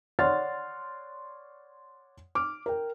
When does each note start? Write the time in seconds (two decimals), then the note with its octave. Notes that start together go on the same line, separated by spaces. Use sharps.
0.19 C#5 D5 F#5 C6 F6 A6
2.35 D6 F6
2.66 A#4 G5